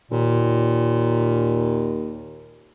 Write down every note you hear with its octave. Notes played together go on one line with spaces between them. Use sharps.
D#2 A#2